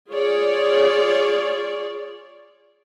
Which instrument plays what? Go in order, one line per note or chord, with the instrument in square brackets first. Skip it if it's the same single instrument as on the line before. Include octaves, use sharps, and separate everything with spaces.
[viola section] F4 G#4 C#5 D5